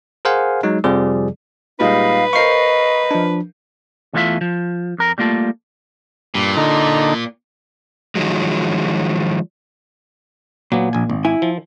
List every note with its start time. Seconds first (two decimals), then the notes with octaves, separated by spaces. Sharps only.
0.25 G#4 A#4 C5 F5 F#5 G#5
0.63 F#3 G#3 D#4
0.84 F2 C3 F3 G3 G#4 D5
1.80 A#2 G3 G#3 D#4 B4 F5
2.33 A#4 C5 D#5 F5 C#6 C7
3.11 F3 D4
4.13 E2 E3 A3 C#4 F4 E5
4.41 F3
4.98 F2 A#4
5.18 G3 A3 A#3 F4 A4
6.35 G2 A#2
6.57 D3 D#4
8.15 D#3 F3 F#3 G#3
10.72 A#2 F#3 B3
10.93 A#1 G#5
11.10 G#1
11.25 E4 G#5
11.42 F3